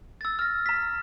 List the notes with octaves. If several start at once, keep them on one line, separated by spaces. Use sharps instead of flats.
E6 A6
F6 A#6
A#5 B6